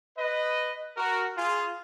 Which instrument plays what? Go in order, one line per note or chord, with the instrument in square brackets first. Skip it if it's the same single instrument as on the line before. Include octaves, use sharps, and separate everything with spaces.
[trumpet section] B4 D#5
F#4 A#4
F4 G#4